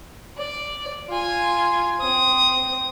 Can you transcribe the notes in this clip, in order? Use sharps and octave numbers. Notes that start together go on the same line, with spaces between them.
D5
F4 G#5
C4 D#6